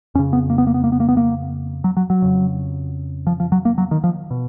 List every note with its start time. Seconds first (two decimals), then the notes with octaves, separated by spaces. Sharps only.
0.15 F2 C#4
0.19 C#3
0.33 B3
0.50 A#3
0.58 B3
0.67 A#3
0.74 B3
0.84 A#3
0.92 B3
1.00 A#3
1.09 B3
1.17 A#3
1.84 F#3
1.97 F#3
2.10 F#3
2.22 F2 C#3
3.27 F3
3.40 F3
3.52 F#3
3.65 A#3
3.78 F#3
3.91 D#3
4.04 F3
4.31 B2